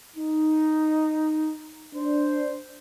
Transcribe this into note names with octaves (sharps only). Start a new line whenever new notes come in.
D#4
D4 C5